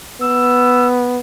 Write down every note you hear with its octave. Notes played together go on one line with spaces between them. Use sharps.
B3 E6